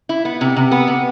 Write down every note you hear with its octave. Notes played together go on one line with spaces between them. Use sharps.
E4
B3
C3
C3
B3
C3